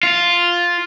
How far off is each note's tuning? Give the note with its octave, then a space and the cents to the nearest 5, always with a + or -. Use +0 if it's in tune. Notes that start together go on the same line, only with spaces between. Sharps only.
F4 +0